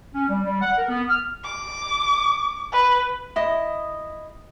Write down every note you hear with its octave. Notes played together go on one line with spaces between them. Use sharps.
C#4
G3
G3
F#5
A#4
B3
F6
D6
B4
E4 D#5